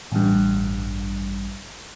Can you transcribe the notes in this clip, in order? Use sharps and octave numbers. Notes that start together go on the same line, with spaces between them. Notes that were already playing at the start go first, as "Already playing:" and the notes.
A1 G2